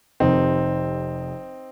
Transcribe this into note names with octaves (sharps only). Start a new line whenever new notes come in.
F1 F2 C3 D#3 C4 D#4